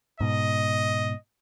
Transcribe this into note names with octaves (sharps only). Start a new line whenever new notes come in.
G#2 B2 D#5